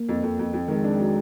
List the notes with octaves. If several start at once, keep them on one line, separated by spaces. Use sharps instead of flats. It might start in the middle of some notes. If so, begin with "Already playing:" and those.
Already playing: A#3
F2
F2
F2
F2
D#3 G#3
D4
F#3